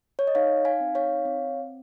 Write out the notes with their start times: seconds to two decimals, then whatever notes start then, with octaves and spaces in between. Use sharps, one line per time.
0.19 C#5
0.27 D#5
0.35 D#4 C#5 F5
0.65 F5 G#5
0.81 C4
0.95 C#5 F5
1.25 C4